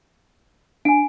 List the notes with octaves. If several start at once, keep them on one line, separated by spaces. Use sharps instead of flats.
D4 F#5 G#5 D7